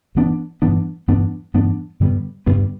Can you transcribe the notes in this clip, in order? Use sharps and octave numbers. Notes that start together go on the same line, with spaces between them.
G2 E3 B3 D4
G2 E3 B3 D4
G2 E3 B3 D4
G2 E3 B3 D4
G2 D3 G3 B3
G2 D3 G3 B3